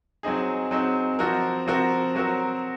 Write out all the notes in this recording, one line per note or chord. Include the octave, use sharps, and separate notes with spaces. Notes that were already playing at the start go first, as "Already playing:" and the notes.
F#3 C4 D#4 G#4
F#3 C4 D#4 G#4
F3 C4 F#4 A#4
F3 C4 F#4 A#4
F#3 C4 F#4 A#4